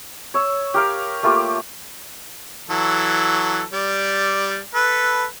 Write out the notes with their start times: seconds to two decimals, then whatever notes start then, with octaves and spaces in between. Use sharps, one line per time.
0.34 C#5 E6
0.74 G4 A#4 F5
1.23 A3 A#3 F4 G4
2.70 E3 F#3 A4
3.73 G3 D5
4.74 A4 B4